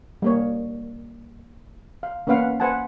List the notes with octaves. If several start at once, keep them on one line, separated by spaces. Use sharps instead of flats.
G3 A#3 C#5
F5
A#3 B3 C#4 B4 F5 F#5
B4 C5 F#5 G#5 A5